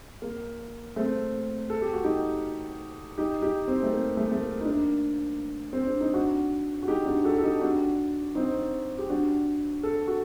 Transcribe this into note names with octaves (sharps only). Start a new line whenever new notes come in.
A#3
A3 C4
A4
G4
F#4
D#4 G4
D#4 G4
D#4 G4
C4 D#4
A3
A#3
A3
A3
A#3
D#4
A#3 D4
C4
D4
D#4
D4 F#4
F#4
D#4 G4
D4 F#4
F#4 A4
A4
D#4 G4
D4 F#4
C4 D#4
G4
D4 F#4
A4
F#4 A4